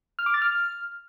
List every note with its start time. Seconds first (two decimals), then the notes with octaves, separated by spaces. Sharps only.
0.19 F6
0.26 D6
0.34 A6
0.42 F6